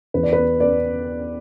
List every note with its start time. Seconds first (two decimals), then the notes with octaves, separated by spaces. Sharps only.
0.14 E2 B4
0.23 D5
0.33 B4
0.37 B3
0.60 B3 D5